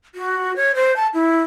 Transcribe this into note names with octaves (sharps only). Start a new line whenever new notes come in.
F#4
C#5
C5
A5
E4